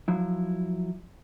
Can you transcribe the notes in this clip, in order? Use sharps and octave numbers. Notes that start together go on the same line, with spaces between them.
F3 F#3 E4